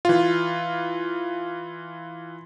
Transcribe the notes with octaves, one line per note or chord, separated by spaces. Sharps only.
E3 F4